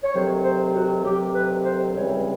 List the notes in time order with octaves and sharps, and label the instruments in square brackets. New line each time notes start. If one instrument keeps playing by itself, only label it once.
[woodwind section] C#5
D2 C3 D#3 F#3 C5
C5
F#4
D2 C3 D#3 F#3 G4
B4
C5
C#2 C3 E3 G3 C#5